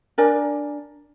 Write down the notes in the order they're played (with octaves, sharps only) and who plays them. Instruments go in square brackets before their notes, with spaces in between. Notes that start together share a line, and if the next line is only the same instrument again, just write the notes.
[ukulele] D4 A#4 D5 G#5